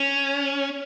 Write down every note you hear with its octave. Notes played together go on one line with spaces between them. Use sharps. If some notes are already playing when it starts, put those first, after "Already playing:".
Already playing: C#4